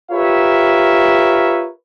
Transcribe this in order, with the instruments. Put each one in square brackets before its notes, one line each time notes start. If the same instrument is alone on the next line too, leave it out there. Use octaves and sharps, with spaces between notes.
[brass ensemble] F4 G4 A#4 B4 C#5 E5